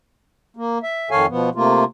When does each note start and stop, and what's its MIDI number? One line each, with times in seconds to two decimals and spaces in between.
0.56 0.78 58
0.83 1.10 76
1.11 1.26 41
1.11 1.26 51
1.11 1.26 69
1.11 1.26 73
1.11 1.26 77
1.11 1.26 80
1.29 1.49 47
1.29 1.49 53
1.29 1.49 59
1.55 1.84 48
1.55 1.84 57
1.55 1.84 58
1.55 1.84 65